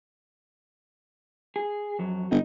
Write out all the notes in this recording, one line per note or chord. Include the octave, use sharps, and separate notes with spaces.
G#4
F2 F#3
G1 D#4